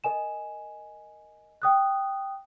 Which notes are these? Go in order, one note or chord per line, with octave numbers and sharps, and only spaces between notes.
A#4 D#5 G#5 E7
G5 D#6 F#6